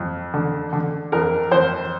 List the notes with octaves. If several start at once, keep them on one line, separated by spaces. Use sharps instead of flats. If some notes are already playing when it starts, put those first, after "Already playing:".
Already playing: F2
D3
D3
F2 A#4
F2 C5